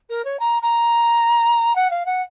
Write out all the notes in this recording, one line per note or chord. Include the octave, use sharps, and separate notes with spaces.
A#4
C#5
A#5
A#5
F#5
F5
F#5